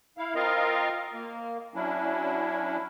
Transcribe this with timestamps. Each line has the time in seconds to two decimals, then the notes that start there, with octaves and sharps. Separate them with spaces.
0.18 E4 F5
0.35 C4 F4 A#4 D#5 F5
1.14 A#3
1.75 F#3 C#4 D4 E4